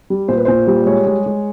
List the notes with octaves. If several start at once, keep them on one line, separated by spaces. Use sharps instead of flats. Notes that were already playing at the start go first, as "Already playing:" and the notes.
G3
A#2 C5
B4
A#2 C5
G3
G#3 C#5
G#3
G#3